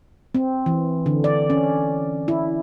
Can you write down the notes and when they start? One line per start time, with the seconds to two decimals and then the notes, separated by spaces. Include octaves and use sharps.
0.35 C4
0.66 E3
1.06 D3
1.24 D5
1.50 C#4
2.28 E4